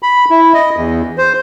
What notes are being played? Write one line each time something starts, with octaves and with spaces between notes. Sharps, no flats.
B5
E4
D#5
E2
C5